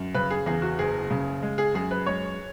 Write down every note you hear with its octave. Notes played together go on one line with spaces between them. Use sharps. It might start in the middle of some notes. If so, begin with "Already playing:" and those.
Already playing: F#2
C#3 B4
G#4
E2 G#4
F#4
F#1 G#4
C#3
G#3
G#4
F#2 G#4
B4
G#3 C#5